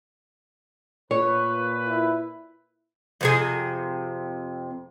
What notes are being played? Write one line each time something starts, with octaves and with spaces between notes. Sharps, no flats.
A#2 B4 C#5
E4
F2 C3 G#4